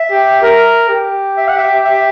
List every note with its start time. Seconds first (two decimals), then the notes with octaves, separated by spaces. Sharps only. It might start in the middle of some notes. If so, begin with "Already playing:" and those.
Already playing: E5
0.11 G4
0.43 A#4
0.90 G4
1.37 E5
1.48 F#5
1.58 E5
1.85 E5